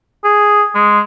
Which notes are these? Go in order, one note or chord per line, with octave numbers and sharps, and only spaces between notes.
G#4
G#3